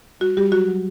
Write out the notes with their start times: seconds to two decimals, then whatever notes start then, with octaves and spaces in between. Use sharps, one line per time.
0.20 G3 F#4
0.37 G3 G4
0.52 F#3 F#4
0.68 F#3